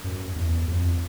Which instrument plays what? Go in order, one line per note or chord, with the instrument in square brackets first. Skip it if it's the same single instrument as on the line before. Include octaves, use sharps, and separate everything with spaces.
[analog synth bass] F#2
E2
F2